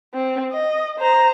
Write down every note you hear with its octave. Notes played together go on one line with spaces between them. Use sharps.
C4
D#5
C5 A#5